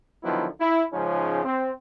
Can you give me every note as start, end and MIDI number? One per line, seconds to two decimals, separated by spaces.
0.23 0.47 50
0.23 0.47 51
0.23 0.47 53
0.23 0.47 54
0.23 0.47 59
0.23 0.47 64
0.60 0.83 64
0.92 1.39 44
0.92 1.39 49
0.92 1.39 53
0.92 1.39 56
0.92 1.39 61
0.92 1.39 63
1.44 1.71 60